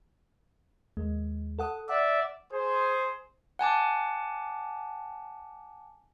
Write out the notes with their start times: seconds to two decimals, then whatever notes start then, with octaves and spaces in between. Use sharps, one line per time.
0.97 D#2 G#3
1.59 A4 F#5 D#6
1.89 D5 E5 F#5
2.53 G#4 C5
3.59 F#5 G#5 A5 D6